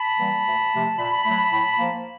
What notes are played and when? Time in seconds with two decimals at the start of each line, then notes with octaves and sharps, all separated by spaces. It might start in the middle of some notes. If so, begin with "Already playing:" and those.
Already playing: A5 B5
0.19 E3 G3 A#3
0.46 D2
0.73 C3 F3 A3
0.98 A#2 A5 B5
1.25 F#3 A3
1.52 A2
1.78 F3 A#3